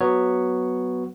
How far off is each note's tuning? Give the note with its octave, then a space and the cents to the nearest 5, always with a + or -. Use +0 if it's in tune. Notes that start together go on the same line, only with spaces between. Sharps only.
F#3 +0 B3 +0 C#5 +0